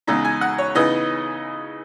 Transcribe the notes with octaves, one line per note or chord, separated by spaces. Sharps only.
E2 C#3 G#3 D#4 A#5
G#5
F#5
C#5
C#3 E3 B3 D#4 D#5